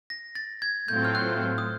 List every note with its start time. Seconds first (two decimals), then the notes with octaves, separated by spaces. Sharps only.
0.10 A#6
0.35 A6
0.62 G#6
0.88 A2 F#3 A3 C4 F4 G6
1.05 F6
1.15 F#6
1.58 D#6